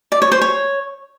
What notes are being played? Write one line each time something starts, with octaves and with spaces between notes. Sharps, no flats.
D5
C#5
C5
C#5